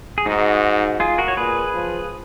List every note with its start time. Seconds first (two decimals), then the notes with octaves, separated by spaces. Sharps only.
0.18 G#4
0.26 G#2 D#4 F#4
1.00 F4 G#4
1.18 F#4 A#4
1.28 C#5
1.37 A#2 G#4 B4
1.74 F3